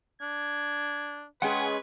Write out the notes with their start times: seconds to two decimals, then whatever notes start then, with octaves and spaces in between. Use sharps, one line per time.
0.22 D4 G#6
1.42 G#3 C#4 G#4 B4 F#5 G5